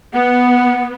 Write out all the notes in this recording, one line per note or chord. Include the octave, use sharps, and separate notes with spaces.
B3 F#5